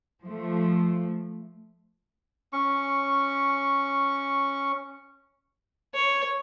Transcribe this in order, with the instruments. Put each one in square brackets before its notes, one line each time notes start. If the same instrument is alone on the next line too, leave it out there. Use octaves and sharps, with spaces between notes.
[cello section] F3 A3
[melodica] C#4 C#6
[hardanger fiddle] C#5